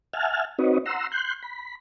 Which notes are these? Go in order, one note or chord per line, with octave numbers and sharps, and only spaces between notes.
E5 F#5 G#5 A5 F6
C4 D#4 F#4 B4 C#5 D#5
F#5 A#5 C6 E6
C6 F#6 G6
B5